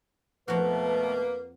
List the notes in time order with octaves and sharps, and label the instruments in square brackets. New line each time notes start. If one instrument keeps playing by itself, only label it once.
[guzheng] F2 F#4 [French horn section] B2 A3 [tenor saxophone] A#3 [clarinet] B4